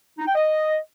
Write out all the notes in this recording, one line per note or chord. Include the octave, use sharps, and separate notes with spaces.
D#4
G5
D#5